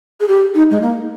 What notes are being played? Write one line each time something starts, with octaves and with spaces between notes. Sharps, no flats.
G#4
G4
D#4
G#3
A#3